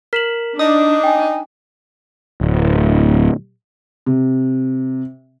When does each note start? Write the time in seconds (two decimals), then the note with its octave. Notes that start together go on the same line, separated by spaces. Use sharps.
0.13 A#4 B6 E7 F#7
0.59 D4 D#4 D#6
1.04 G5 G#5
2.41 D1
4.06 C3